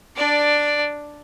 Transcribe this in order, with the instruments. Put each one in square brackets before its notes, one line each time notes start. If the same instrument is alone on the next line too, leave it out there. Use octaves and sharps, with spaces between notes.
[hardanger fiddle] D4 D5